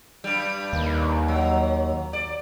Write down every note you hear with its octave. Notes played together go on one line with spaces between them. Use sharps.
G2 G3
D#2
F#3
D5